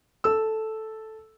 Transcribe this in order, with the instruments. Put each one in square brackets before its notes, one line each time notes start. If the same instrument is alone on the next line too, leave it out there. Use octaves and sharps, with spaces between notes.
[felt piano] A4 E6